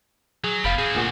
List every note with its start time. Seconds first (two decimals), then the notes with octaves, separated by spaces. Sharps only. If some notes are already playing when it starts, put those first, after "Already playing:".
0.44 F#3 G#4
0.64 F1 G3 B3 F5 B5 D7
0.78 C4 F#4 G#4
0.94 D2 A#2 F#5